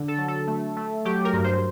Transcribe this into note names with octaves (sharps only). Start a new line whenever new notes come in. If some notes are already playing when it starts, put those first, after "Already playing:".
Already playing: D3
A4
F#3
A4
A3
A3
F#3 G4
A#4
G2
C5